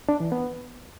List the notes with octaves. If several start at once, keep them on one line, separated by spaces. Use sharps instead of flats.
D4
E3
B3